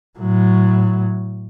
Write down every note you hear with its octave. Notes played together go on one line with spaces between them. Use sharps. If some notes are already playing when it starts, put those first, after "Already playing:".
A2 F#3